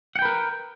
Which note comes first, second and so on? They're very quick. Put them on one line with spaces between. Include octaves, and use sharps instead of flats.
F#5 G5 B4 A#4